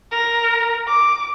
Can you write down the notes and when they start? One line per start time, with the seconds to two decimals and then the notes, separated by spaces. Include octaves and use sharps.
0.11 A#4
0.87 D6